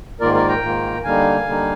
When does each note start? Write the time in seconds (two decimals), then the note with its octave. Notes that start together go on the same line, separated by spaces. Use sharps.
0.20 G#2 D#3 A#3 F4 A#4 D5
0.34 A#4 D5
0.48 G5 A#5
0.62 G#2 D#3 A#3 F4
1.04 D3 G3 A#3 D#4 F5 G#5
1.45 D3 G3 A#3 D#4